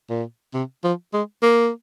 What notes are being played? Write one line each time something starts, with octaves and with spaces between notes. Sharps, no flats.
A#2
C3
F3
G#3
A#3